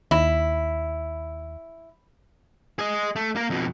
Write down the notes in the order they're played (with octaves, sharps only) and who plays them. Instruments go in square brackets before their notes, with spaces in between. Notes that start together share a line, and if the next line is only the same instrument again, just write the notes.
[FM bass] D#2 [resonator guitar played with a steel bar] E4
[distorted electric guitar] G#4 D#5
A3
A#3 A#4
F2 B2